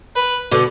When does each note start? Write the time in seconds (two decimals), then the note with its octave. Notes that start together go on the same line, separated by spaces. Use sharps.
0.16 B4
0.52 B2 D3